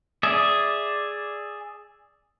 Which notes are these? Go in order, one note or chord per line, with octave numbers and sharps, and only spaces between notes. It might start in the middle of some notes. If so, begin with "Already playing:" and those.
G#4 D5 E5